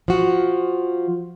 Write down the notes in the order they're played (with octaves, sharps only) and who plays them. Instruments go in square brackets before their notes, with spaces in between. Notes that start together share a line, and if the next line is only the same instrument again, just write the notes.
[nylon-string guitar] F3 F#4